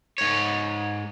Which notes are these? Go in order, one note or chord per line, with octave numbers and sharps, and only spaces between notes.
G#2 C#5